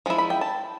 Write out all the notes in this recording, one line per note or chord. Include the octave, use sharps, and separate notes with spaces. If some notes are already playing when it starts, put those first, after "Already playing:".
F3 G#3 E4
B5
G5
A5